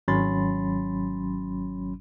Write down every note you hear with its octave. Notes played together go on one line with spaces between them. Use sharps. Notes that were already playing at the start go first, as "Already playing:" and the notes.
G#1 F#3 C#4 B5 C6 A6